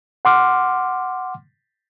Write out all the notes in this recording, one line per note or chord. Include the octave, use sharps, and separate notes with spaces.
F#5 C6 D6 F6